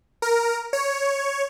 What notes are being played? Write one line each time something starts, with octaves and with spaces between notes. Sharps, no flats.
A#4
C#5